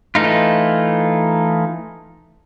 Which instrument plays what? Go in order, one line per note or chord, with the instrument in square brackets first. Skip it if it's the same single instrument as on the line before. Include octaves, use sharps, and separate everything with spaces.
[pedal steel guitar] E3 A3 D#4 F4